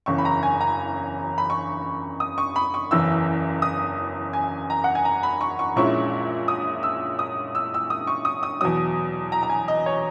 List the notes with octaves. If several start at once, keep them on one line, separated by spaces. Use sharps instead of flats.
F#1 E2 C#3 C#6
B5
A#5
G#5
A#5
B5
C#6
D#6
C#6
B5
C#6
F#1 E2 C#3 E3 E6
D#6
G#5
A#5
F#5
G#5
A#5
B5
C#6
C#6
A#1 A#2 G#3 C#4 E4 C#6
D#6
E6
D#6
E6
E6
D#6
C#6
D#6
D#6
E2 B2 F#3 D#6
A#5
A#5
G#5
D#5
C#5